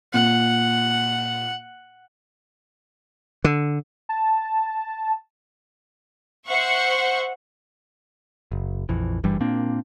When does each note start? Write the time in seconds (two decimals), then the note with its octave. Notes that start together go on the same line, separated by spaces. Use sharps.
0.14 A#2 F#5
3.44 D3
4.09 A5
6.47 C5 E5 F#5 C#6
8.52 F#1
8.89 A#1 F2 E3
9.24 F#1 G2 E3 G3
9.40 A#2 A#3 C4 D4